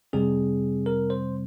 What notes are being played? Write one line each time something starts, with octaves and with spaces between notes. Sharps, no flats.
F2 C3 G3 C4 G#4
A#4
C5